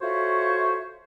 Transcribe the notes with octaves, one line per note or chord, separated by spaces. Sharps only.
F4 F#4 A4 C5 C#5 E5